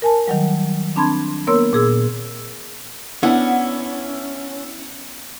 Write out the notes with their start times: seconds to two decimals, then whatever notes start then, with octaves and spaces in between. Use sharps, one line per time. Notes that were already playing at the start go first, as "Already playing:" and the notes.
0.02 A#4 G#5 A5
0.28 D#3 F#3 G3
0.96 C4 D4 A5 B5 C6 G#6
1.47 A#3 B3 A#4 C#5 C6 E6
1.73 A#2 G#4 E6
3.23 B3 C#4 D4 E4 F#5